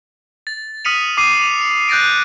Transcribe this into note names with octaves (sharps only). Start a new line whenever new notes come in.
A6
D#6 F6 B6 C#7 D#7 F7
D6 C7 D#7
B6 F7
C#7
F#6 G6 A6 A#6 D7